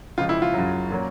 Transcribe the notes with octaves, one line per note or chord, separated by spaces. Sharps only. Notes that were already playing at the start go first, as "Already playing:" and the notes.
C#2 C#3 F3 G#3 F4
E4
F4
F#2 C#3 F#3
A#2 F#3 A#3 C#4